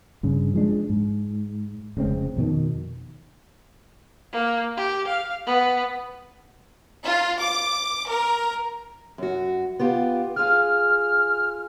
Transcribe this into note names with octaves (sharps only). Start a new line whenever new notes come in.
G2 C#3
F3 G#3 D4
G#2
F1 C#3 G#3 C4
F2 B2 D#3
A#3
G4
F5
B3
F4
D6
A#4
F#2 F#4
B3 F4 G4
F4 G#4 F6